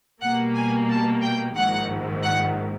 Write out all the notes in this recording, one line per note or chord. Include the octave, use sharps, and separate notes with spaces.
B2 G3 A#3 F#5
G#5
A5
G5
A#1 G#2 D#3 F#5
F#5